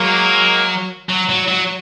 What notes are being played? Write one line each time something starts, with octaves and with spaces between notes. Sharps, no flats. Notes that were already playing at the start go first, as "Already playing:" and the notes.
Already playing: F#3 G#3 A#3
F#3
F#3
F#3